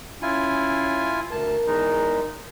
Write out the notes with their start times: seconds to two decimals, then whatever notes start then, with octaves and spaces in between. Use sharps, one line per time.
0.22 C#4 E4 F4 G#5
1.32 D2 A#4 A5
1.66 E2 G#3 D#4